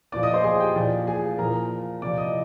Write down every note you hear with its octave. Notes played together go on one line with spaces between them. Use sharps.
A#2 F3 D5 D6
D#5 D#6
C5 C6
G#4 G#5
G4 G5
A#2 F3 D5
G#4 G#5
A#2 F3 A#4 A#5
C3 F3 D5 D6
D#5 D#6